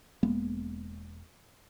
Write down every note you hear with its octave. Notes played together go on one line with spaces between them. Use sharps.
E1 G#3 A#3 B3